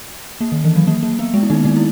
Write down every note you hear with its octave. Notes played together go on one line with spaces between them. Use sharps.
A#3
D#3
E3
F#3
A#3
A#3
B3
G#3
E4
D#3 D#4
D#3 D#4
E4